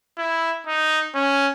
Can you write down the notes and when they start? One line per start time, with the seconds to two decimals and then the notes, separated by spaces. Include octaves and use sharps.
0.18 E4
0.67 D#4
1.15 C#4